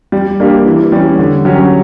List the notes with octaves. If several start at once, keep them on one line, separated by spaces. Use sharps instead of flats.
G3
A#3 D4 G4
E3
G3 C#4
D3
F#3 C#4 G4